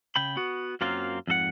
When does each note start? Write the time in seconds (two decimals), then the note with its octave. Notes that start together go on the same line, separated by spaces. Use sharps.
0.16 C#3 G5 B5
0.37 B3 F#4
0.81 F#2 F#3 A#3 C4 F4
1.27 F2 G#2 A4 F#5